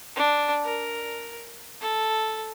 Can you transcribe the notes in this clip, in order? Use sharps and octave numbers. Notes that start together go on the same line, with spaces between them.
D4
A#4
A4